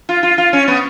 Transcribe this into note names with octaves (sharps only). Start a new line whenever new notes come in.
F4
F4
F4
C#4
B3